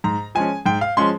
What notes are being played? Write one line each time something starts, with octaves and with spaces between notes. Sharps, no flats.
G#2 A#5
F3 G#3 C#4 G#5
G#2 G5
F5
F3 G#3 C#4 C6